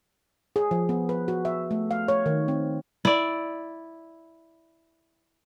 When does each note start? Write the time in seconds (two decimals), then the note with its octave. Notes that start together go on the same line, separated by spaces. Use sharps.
0.56 G#4
0.71 F3
0.89 B3
1.09 B4
1.28 F#4
1.45 E5
1.71 A3
1.91 F5
2.08 C#5
2.26 D#3
2.48 C4
3.05 E4 D5